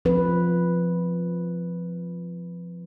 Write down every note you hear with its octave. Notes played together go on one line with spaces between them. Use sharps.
F3 C4 B4